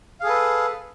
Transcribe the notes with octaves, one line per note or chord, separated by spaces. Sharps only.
G#4 A4 B4 F5